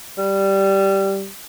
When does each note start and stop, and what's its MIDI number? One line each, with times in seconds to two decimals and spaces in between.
0.18 1.28 55